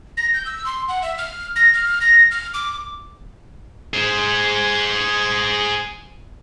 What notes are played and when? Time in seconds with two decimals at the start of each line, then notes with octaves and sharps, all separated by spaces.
0.17 A#6
0.34 G6
0.46 E6
0.66 C6
0.88 F#5
1.02 E5
1.18 F6
1.56 A#6
1.74 F6
2.01 A#6
2.31 F6
2.54 D6
3.94 G#4 C5